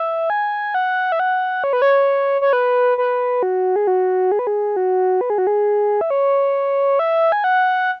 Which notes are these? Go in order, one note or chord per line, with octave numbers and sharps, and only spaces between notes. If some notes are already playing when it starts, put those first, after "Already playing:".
Already playing: E5
G#5
F#5
E5
F#5
C#5
B4
C#5
C#5
B4
B4
F#4
G#4
F#4
G#4
B4
G#4
F#4
B4
G#4
F#4
G#4
E5
C#5
E5
G#5
F#5